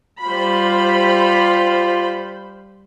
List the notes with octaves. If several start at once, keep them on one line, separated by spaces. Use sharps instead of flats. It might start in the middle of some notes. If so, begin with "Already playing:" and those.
G3 F4 C5 B5